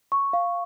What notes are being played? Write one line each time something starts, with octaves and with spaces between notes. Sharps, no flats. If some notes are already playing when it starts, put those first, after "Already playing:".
C#6
F5